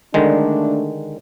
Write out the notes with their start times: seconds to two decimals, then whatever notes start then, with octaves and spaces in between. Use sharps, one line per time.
0.14 D3 D#3 G#3 A3 D4